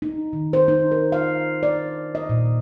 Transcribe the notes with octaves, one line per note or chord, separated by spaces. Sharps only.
D#4
D#3
C5
D#4
A#4
F5
D5
D#5
A#2